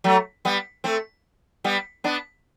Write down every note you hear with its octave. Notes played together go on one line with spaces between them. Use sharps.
F#3 A3
G3 B3
A3 C4
G3 B3
B3 D4